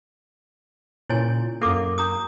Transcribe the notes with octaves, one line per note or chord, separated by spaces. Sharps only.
A#2 C#3 E4 C#5 G#5
F#2 A#3 A4 D6
C#4 A#5 D#6